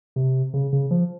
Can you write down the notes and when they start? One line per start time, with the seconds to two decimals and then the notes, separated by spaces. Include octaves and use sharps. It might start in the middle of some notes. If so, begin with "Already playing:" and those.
0.16 C3
0.54 C#3
0.73 C#3
0.91 F3